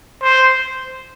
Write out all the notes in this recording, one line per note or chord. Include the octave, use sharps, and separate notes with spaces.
C5